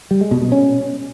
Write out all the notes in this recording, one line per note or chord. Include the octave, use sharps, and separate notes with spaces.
G3
G#3
B2
B2
C#4